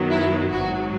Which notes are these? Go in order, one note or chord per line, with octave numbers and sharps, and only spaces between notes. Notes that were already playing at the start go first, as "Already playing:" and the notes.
Already playing: F#2 D#3 F#3 B3
E4
G#1 G#2 F#3 F#4